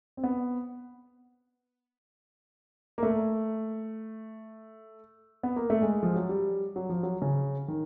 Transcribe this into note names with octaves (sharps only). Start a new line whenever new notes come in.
C4
B3
A#3
A3
B3
A#3
A3
G#3
F3
F#3
G3
F#3
F3
F#3
C#3
D#3